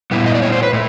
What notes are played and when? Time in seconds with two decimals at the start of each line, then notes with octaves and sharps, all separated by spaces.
0.11 A#2 G3 B3 E4
0.26 D#5
0.35 D5
0.42 C#5
0.52 C5
0.63 B4
0.73 A2 A3